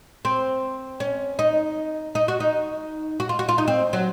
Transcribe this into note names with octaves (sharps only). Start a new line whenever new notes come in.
C4
C#4
D#4
D#4
F#4
D#4
F#4
F4
F#4
F4
D#4
C4
F#3